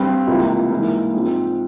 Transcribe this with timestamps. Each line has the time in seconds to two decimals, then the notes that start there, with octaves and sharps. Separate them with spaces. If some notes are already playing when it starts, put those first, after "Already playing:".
Already playing: G2 G3 C4
0.27 C#2 C3 E3 A#3 F4
0.71 G#2 E3 A#3 E4
1.13 G#2 F3 C4